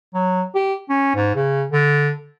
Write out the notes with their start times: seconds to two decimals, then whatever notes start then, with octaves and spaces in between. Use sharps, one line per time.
0.14 F#3
0.55 G4
0.89 C#4
1.15 G#2
1.35 C#3
1.71 D3